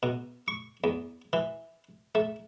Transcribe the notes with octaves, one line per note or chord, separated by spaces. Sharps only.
B2
C#6
E2
E3
A3